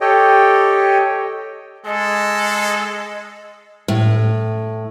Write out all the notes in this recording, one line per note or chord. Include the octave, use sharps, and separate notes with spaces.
G4 A4 C#5 D#5 G5
G#3 A4 D#5
A2